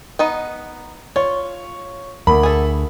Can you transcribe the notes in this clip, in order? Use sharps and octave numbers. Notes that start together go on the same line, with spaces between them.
B3 D#4 D#5
F4 C#5
D2 A#4 F#5 B5
G#4 A4